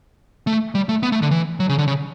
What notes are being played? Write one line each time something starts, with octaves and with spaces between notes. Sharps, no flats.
A3
G3
A3
B3
A3
D3
E3
F#3
C#3
D3
C#3